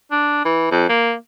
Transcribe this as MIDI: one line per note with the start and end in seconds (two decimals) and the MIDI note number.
0.11 0.42 62
0.45 0.68 52
0.71 0.85 41
0.89 1.13 58